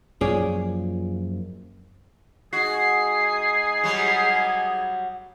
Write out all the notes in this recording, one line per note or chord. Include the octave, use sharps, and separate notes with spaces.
F#2 A#2 F3 G#4 C#5 D5
G#3 D#4 F#4 G#4 C7
F#3 G3